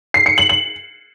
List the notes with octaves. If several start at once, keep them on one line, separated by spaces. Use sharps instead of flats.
C7
C#7
F#7
F#7